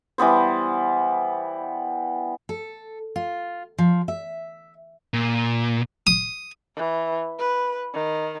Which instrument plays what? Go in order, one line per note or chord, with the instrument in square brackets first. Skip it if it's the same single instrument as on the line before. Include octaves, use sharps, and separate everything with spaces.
[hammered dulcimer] E3 G3 B3 C5
[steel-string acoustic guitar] A4
F4
F3
E5
[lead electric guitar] A#2
[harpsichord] D#6
[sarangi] E3
B4
D#3